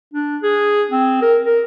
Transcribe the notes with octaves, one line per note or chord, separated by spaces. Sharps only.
D4
G#4
C4
A#4
A#4